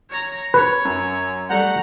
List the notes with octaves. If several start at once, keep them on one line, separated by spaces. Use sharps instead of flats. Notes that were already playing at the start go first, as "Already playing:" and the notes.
C#5 A#5
B4 C#5
F#2
G3 A3 F#5 A#5 G6 C#7